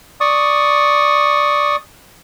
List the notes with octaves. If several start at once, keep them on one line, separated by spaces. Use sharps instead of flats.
D5 C#6 D#6